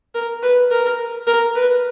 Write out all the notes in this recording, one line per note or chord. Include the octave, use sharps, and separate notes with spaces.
A#4
B4
A#4
A#4
B4